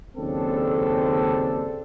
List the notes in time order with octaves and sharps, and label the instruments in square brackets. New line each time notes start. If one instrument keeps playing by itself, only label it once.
[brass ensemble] F#1 D#2 C#3 C4 D4 A4